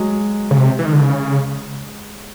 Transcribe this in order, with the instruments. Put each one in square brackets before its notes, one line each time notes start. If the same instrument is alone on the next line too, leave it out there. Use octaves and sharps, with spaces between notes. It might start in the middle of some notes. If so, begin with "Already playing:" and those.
Already playing: [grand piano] F#3 G#3
[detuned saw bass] C#3
C3
E3
D#3
D3
C#3